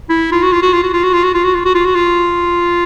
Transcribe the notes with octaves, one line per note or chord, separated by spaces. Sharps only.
E4
F4
F#4
F4
F#4
F4
F#4
F4
F#4
F4
F#4
F4
F#4
F4
F#4
F4
F#4
F4